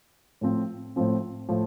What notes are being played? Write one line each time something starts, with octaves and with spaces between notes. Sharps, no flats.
A2 F3 C4
A2 F3 C4
A2 F3 A3